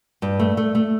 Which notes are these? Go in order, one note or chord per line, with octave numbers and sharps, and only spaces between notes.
G2
A3
A3
A3